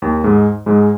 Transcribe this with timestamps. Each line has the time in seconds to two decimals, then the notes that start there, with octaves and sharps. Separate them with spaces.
0.02 D#2 D#3
0.24 G#2 G#3
0.66 G#2 G#3